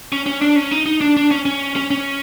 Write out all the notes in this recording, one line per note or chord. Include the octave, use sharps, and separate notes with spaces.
C#4
C#4
D4
C#4
D#4
D#4
D4
D4
C#4
C#4
C#4
C#4